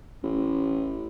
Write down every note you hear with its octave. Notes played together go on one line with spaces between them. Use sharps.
A1